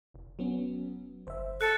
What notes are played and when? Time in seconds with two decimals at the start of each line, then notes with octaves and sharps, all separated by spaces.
0.14 F1
0.39 F#3 B3 C#4
1.27 G1 C5 E5
1.61 A4 F#6 C#7